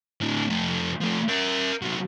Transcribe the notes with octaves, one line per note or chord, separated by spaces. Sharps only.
A2 D3
F2 A3
F3 A3
A#4 E5
C2 F#3